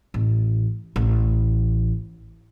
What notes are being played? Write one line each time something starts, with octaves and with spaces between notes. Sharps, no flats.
A1
A1